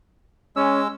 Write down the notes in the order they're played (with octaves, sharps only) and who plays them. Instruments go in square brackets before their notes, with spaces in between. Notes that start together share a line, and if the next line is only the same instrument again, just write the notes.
[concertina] G#3 E6 [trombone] C#4